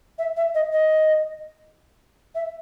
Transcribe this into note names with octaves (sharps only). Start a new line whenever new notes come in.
E5
E5
D#5
D#5
E5